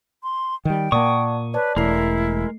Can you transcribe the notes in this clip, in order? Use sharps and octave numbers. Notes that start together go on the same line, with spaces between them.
C6
D#3 G3 G5
A#2 A#3 D5 F#5 A5 C#6 D#6
B4 C#5 D5 A5
E1 G#3 A3 E4 A#4 C7